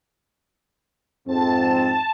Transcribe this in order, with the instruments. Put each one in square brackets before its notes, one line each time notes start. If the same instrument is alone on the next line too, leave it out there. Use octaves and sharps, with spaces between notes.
[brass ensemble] F2 G#2 C4 [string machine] A5